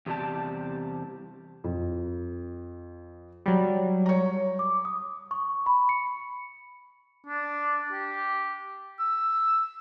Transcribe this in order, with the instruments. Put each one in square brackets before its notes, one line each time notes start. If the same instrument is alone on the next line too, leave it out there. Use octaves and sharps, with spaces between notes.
[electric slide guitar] E2 C3 G3 G4 A5
[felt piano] F2
[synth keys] F#3 G3
[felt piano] C#5 A#5
[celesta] D6
D#6
C#6
B5
C#7
[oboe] D4
G4
E6